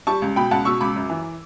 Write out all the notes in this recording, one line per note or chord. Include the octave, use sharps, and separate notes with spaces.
G3 A5 C#6
C#2
B2 G5 B5
C#2 F#5 A5
B2 C#6 E6
C#2 B5 D6
F#2
E3